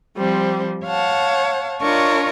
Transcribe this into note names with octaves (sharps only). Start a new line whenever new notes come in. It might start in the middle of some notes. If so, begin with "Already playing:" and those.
F3 G3 C4 C5
C#5 F5 F#5 A5
D4 F4 A#4 C#5 D#5 C#6